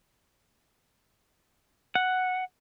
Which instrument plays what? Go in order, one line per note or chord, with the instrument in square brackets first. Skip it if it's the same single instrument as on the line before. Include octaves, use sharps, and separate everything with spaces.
[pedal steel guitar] F#5